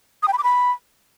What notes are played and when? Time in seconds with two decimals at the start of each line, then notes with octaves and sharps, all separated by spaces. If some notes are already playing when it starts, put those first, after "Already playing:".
0.23 D#6
0.28 G5
0.33 B5
0.38 D6
0.44 B5